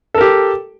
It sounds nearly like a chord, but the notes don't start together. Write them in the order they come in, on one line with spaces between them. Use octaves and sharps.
A4 A#4 G4